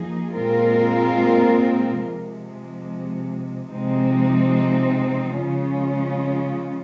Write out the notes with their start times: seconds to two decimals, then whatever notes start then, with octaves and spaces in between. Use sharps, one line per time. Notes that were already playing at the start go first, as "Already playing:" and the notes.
Already playing: F3 A#3 D#4 G#4
0.32 A#2 G#3 C4 F4 A#4
2.00 C3 F3 G#3
3.69 C3 F3 G#3 C4 D#4
5.36 C#3 F3 G#3 C#4 F4